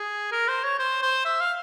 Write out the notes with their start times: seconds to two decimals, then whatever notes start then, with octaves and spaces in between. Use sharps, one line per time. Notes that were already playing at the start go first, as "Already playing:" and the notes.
Already playing: G#4
0.32 A#4
0.48 C5
0.64 C#5
0.79 C5
1.02 C5
1.25 E5
1.40 F5